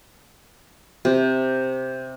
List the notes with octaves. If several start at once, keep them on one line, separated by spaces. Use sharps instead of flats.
C3